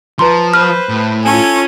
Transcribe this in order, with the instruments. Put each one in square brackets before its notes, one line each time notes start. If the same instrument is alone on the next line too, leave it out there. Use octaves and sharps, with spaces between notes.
[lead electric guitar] F3 [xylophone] B4 A#5 C6
[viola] B4 C5 [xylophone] F6
[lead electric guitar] A2
[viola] C#4 F4 [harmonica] A4 G#5